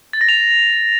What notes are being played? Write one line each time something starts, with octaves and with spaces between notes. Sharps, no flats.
A6
A#6
F7